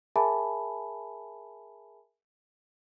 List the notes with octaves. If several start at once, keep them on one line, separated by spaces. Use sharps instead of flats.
G#4 A#4 E5 G#5 A5 B5